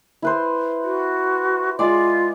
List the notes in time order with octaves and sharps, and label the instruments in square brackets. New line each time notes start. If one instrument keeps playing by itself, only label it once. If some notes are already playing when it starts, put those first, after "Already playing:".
[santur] E4 B4 C5
[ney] F#4
[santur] G#3 G#4 D5 [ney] F4